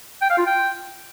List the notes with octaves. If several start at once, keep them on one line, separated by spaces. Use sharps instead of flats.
G5
F5
F4
G5